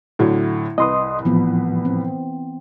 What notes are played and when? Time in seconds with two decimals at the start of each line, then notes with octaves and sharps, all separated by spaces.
0.19 A2 D3 F#3 E4
0.78 C2 B4 D#5 C6 D#6
1.25 A2 E3 F3 B3
1.85 C4